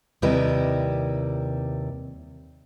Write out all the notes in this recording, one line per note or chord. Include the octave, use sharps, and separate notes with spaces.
D#2 C3 G3 E4 B4 D#5